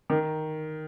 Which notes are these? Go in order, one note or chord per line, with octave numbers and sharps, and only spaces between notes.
D#3